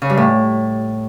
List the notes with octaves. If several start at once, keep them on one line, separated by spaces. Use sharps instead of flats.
C#3
G2
A2